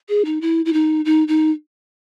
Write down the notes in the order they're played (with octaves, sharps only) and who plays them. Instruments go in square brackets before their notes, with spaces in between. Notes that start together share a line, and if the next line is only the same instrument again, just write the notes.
[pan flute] G#4
D#4
E4
E4
D#4
D#4
D#4